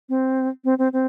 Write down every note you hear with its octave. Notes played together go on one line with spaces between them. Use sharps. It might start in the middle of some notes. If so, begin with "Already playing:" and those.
C4
C4
C4
C4